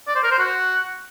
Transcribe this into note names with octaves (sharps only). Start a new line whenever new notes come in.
D5
C5
A#4
C5
F#4